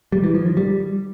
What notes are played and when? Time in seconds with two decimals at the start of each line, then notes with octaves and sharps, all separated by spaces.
0.12 G3
0.24 E3
0.35 F3
0.46 D#3
0.57 G3